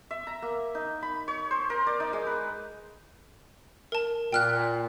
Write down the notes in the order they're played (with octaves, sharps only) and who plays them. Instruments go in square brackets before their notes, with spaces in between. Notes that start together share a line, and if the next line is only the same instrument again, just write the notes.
[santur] E5
A#5
A#3
D#4
B5
C#5
C5
A#4
D5
D#4
G#3
B4
[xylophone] A#4 A5
[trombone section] A#2 [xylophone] G5 F6 F#6